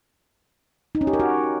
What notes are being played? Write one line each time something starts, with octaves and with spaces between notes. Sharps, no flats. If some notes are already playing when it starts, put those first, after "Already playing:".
D#4
C#4
G4
A#4
F#4